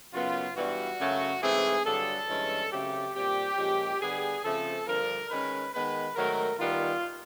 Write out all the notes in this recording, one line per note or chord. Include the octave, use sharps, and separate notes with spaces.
F#2 C#3 F#3 B3 F4
G2 E3 G3 B3 F#4
F#2 C#3 F#3 A3 C#4
G#2 E3 A3 C4 G#4
G2 D3 F#3 A4
G2 E3 G#3 C#4
C#3 F#3 A3 C4 G4
A#2 G3 C4 G4
A#2 F3 G#3 C#4
D3 G3 B3 G#4
C#3 F3 A3 C4 A4
G2 D3 F3 A#4
D#3 G#3 C#4 B4
D#3 G#3 B3 B4
G#2 D#3 F#3 A3 A#4
D#3 G3 B3 F4